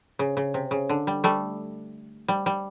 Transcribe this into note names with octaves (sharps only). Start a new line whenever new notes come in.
C#3
C#3
C3
C#3
D3
G3
G3 A3
G3
G3